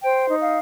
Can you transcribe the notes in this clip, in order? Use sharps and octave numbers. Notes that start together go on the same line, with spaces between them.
C5 G5
D#4
F5